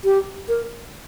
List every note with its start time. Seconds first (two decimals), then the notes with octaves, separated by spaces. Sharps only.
0.05 G4
0.49 A#4